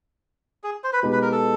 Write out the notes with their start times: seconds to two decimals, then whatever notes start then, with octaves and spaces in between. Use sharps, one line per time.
0.64 G#4
0.84 C5
0.93 B4
1.03 B2 G#3 B3 D#4 G4
1.12 B4
1.22 A#4
1.32 A4